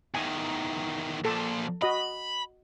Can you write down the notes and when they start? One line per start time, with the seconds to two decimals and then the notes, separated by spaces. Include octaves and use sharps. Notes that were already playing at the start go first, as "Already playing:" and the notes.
0.15 E2 D#3 G#5
1.25 A#2 F3 A4
1.82 F#4 D#5 B5